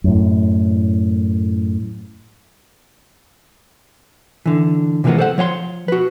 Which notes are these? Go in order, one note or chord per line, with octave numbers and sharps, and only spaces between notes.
F#2 A2
D3 E3
C3 E3 F3 G#3 A#3 B3
A4 C5 D5 F#5
F3 C#5 F5 C6
F#4 B4